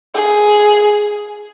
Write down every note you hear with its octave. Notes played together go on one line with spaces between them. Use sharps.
G#4